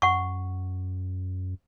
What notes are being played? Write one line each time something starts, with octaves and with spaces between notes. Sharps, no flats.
F#2 F#5 C#6